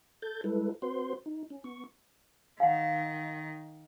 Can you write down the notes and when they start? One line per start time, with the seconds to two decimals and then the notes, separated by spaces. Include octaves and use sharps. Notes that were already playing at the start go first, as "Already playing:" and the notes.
0.22 A4 G6 A6
0.44 G3 G#3 E4 A4 B4
0.82 C4 F#4 B4 C5 C6
1.26 D#4
1.50 C#4
1.64 B3 C#6
2.60 D#3 F5 F#5